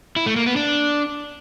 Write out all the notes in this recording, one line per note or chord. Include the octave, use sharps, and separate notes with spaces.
E4
A3
A#3
B3
D4